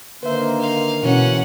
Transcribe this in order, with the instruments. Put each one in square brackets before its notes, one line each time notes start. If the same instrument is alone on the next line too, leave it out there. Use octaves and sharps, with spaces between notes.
[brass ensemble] D3 D#3 A#3 [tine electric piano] B4 E5 [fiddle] C5
[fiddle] F5
[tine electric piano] B2 E3 [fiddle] C#4 F#5